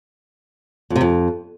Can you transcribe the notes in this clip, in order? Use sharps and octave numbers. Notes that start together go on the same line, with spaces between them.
F2
C3
F2